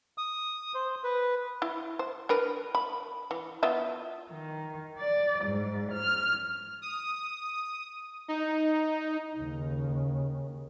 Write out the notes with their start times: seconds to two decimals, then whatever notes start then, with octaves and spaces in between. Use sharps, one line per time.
0.18 D#6
0.75 C5
1.04 B4
1.62 E4
1.99 C5
2.29 D4 A#4 B4
2.75 B5
3.31 E3
3.63 B3 F4 E5
4.31 D#3
4.99 D5
5.43 G#2
5.91 F6
6.82 D#6
8.28 D#4
9.36 D#2 C#3